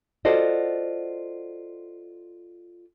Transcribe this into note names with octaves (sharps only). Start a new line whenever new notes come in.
F4 F#4 A4 C5 D5 D#5